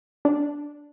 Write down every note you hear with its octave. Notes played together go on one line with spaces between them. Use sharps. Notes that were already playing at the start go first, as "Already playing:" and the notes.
D4